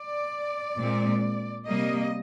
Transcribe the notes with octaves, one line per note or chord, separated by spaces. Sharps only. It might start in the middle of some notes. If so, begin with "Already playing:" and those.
Already playing: D5
A#2 G#3 C4
C3 G3 A#3 D#5